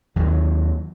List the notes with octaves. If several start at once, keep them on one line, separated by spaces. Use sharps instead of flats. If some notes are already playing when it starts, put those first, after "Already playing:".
D#2 F#3